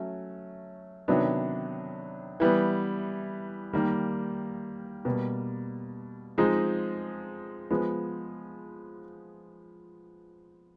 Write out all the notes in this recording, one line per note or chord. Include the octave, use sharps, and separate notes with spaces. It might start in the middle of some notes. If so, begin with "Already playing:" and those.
Already playing: F#3 A3 C#4
C3 D#3 F#3 B3 D4
E3 G3 B3
D#3 G3 A#3
B2 G3 A#3
F3 G#3 C4 D#4
F3 G#3 B3